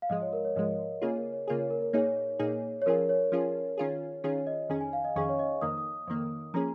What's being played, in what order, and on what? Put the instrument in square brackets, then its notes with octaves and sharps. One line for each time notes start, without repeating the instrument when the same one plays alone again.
[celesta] F5
[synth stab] G#2 F3 G#3 [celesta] D#5
[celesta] C#5
A#4
C#5
[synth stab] G#2 F3 G#3 [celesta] D#5
[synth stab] C#3 A#3 F4 G#4 [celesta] C#5
[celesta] A#4
C#5
[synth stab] C#3 A#3 F4 G#4 [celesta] A#4
[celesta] C#5
A#4
A#4
[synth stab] A#2 A#3 D#4 G#4 [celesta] C#5
[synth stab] A#2 A#3 D#4 G#4
[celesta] C#5
[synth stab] F3 C#4 F4 G#4 [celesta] A#4
[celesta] C#5
[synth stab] F3 C#4 F4 G#4
D#3 C#4 F4 G#4
[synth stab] D#3 C#4 F4 G#4 [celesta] C#5
[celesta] D#5
[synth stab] F2 D#3 C#4 G#4 [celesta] G#5
[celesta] G#5
F5
D#5
[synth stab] F2 D#3 C#4 G#4 [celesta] C#6
[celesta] C#5
D#5
[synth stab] F2 D#3 A#3 [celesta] D#6
[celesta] D#6
[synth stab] F2 D#3 A#3
[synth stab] F3 A#3 C#4 G#4 [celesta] A#5